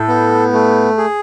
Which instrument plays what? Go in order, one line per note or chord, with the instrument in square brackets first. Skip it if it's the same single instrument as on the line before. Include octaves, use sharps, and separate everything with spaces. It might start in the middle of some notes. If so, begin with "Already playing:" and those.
Already playing: [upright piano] A2 [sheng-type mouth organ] A4
[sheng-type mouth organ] B3
A3
G#4